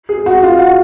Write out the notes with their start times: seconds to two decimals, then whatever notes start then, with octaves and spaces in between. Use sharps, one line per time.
0.09 G#4
0.26 F#4
0.43 F4
0.59 F#4